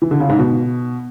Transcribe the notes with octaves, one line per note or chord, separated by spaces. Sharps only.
E3
D3
C#3
G#2
B2